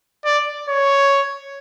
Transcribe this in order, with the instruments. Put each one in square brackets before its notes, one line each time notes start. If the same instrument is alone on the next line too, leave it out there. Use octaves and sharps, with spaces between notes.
[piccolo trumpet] D5
C#5